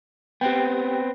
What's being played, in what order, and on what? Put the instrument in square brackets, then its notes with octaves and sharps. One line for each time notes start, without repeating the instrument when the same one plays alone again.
[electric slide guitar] B3 C4 [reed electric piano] G4 G5